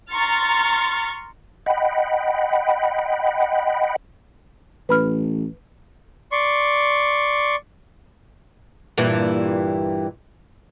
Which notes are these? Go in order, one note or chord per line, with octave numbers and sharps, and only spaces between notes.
A#5 C6 C#6 F6 A6
D#5 F#5 G5 B5
A1 B4 B5 F6
D5 C6 C#6
G2 A#2 E3